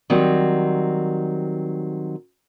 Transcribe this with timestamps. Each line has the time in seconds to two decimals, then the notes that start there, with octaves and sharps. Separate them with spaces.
0.10 D#3 F#3 G3 C4